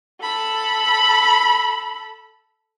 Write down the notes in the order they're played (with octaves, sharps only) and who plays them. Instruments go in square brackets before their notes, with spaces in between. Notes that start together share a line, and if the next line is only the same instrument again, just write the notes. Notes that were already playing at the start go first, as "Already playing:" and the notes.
[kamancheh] A4 B5